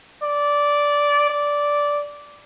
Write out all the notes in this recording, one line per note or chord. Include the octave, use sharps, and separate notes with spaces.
D5
D5